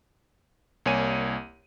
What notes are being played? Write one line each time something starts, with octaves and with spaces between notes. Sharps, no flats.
C2 A#3 C#5 G#5 D#7